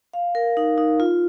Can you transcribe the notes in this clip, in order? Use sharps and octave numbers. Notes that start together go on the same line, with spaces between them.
F5
A#4
D#4
D#4
F4